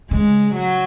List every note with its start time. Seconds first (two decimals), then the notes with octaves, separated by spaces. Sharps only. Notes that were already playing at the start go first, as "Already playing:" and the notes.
0.11 C#3 G#3
0.54 F#3